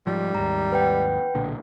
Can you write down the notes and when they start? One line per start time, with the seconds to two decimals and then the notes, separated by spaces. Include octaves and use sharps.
0.07 G#2 F3 G3
0.35 D#2 G#2 A#5
0.72 B4 F#5 G5
1.35 B1 A#2 D3